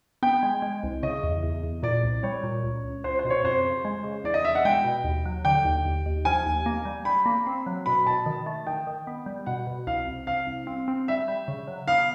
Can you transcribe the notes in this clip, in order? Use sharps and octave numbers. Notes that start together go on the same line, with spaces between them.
B3 G5
G#3
G#3
C2
C#3 D#5
E2
E2
E2
A#2 D5
C2
G3 C#5
A#2
C#2
C#2
C#2 C5
C5
B2
C#5
F2 C5
C#3
G#3
C#3
E2 D5
D#5
E2 E5
F#5
G#3 G5
B2
D#2
F#3
D3 G5
D#2
D#2
D#2
F3 G#5
D#2
A#3
G3
G3 B5
A#3
C4
F#3
B2 B5
B2 A5
D#3
A3
D#3 G5
D#3
B3
G3
B2 F#5
B2
C2 F5
C2
C2 F5
C2
C4
C4
G3 E5
G3
C#3
F#3
B3 F5